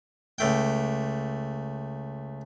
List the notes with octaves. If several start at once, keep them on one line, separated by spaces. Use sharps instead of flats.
C#2 A3 G5